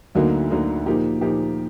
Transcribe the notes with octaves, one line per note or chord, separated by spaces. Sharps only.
D2 D3 F#3 A#3 D#4
D2 D3 F#3 A#3 D#4
A#2 F3 A#3 D#4 G4
A#2 F3 A#3 D#4 G4